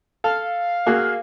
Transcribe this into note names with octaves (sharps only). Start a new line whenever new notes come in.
A4 F5
A#3 F#4 G#4